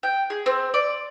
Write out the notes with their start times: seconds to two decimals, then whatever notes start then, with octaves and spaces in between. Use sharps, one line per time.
0.03 G5
0.30 G#4
0.46 C4
0.74 D5